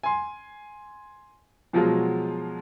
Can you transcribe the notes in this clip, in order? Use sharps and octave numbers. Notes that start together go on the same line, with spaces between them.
G#5 C6
B2 F3 F#3 G#3 F4